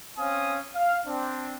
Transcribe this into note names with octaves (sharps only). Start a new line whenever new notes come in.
C4 C#4 F5 G#5 D#6
F5
C4 D4